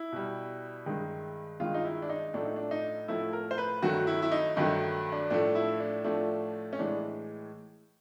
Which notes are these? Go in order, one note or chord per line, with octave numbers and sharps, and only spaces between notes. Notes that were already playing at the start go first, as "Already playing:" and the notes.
Already playing: E4
B2 G3
G2 D#3 G#3
G2 D#3 G#3 F4
D#4
E4
D4
D#4
A2 F3 A3 D4
D#4
D4
D#4
A2 F3 A3 E4
A#4
C5
B4
G2 D#3 F#3 A3 F#4
E4
E4
D#4
G2 D#3 F#3 A3 D#4
D4
A2 F3 A3 D4
E4
D4
A2 F3 A3 D4
C#4
A2 E3 G#3 D4